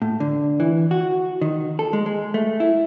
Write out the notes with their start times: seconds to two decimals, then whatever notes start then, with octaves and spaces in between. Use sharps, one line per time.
0.02 A2
0.20 D3
0.60 E3
0.91 F#4
1.42 D#3
1.79 A4
1.93 G#3
2.06 G#3
2.34 A3
2.60 E4